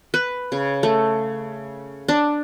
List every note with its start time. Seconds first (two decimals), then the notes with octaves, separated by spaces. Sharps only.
0.14 B4
0.52 C#3
0.83 A3
2.08 D4